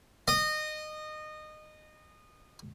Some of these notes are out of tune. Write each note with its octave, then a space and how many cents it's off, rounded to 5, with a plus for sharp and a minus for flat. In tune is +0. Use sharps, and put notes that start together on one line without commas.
D#5 -20